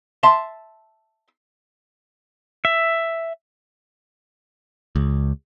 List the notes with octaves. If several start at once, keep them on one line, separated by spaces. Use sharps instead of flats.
E5 A5 C6
E5
C#2